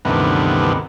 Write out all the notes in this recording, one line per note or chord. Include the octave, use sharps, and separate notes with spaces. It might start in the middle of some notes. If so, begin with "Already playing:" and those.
D2 G2 C3 D#3 E3 B3